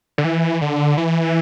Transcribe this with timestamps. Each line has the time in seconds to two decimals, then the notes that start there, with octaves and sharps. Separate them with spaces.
0.18 D3
0.24 E3
0.61 D3
0.98 E3